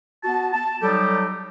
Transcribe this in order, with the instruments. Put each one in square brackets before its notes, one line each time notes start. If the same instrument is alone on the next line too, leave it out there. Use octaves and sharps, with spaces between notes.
[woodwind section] B3 F#4 A5
A5
F#3 G3 D#4 G4 A4